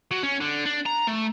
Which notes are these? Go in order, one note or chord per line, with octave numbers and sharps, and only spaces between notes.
F#3
C#4
D3
D4
A#5
A3